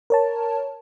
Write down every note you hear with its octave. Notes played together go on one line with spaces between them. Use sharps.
A#4 C#5 A5